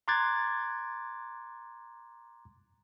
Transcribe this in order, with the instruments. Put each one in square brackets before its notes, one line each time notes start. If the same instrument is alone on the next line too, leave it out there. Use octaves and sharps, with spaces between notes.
[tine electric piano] A#5 C6 D6 F#6 G#6 A6